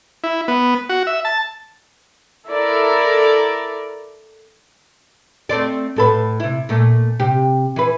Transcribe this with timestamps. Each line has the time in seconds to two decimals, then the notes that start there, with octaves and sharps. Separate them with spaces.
0.24 E4
0.48 B3
0.89 F#4
1.07 E5
1.25 A5
2.48 E4 A4 A#4 D5
5.49 A3 C4 D5
5.96 A2 A4 B4
6.40 C3 E4
6.69 A#2 A3
7.19 C3 G4
7.76 E3 B4